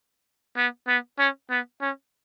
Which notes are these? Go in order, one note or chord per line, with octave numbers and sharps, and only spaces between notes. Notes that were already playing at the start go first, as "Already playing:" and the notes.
B3
B3
C#4
B3
C#4